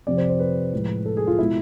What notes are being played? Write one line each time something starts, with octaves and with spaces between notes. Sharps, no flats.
F2 C3 F3 D5
C5
C5
B4
A2 F3 G#3
A4
G#4
F4
B2 G#3 E4